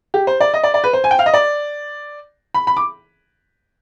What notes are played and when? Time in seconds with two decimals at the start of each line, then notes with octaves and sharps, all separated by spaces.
0.14 G4
0.27 C5
0.41 D5
0.54 D#5
0.64 D5
0.74 D5
0.84 B4
0.93 C5
1.04 G#5
1.11 G5
1.19 F5
1.26 D#5
1.34 D5
2.54 B5
2.67 B5
2.77 D6